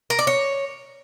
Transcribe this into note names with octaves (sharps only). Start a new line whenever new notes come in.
A#4
D5
C#5